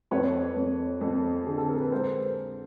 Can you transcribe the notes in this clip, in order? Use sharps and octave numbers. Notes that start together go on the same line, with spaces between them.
F2 B4 C#5
F2
F2
D3 G#4
A4
A#4
B4
G#3 A#4 C5